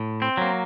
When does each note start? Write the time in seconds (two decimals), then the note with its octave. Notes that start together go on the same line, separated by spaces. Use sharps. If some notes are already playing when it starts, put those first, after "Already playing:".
Already playing: A2
0.22 C4
0.37 F#3 A#3